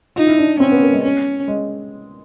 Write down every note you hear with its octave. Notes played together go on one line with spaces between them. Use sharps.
D#4 F4
E4
D4
C4 C#4
B3
A#3
G#3
C#4
G#3